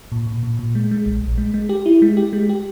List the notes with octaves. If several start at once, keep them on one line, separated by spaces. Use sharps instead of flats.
A#2
A#2
A#2
A#2
G#3
G#3
A#1
A#1
G#3
G#3
G4
E4
G#3
G4
G#3
G4